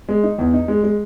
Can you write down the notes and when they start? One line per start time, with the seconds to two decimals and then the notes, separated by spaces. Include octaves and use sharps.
0.09 G#3
0.23 D#4
0.38 E2
0.53 D#4
0.68 G#3
0.84 G#3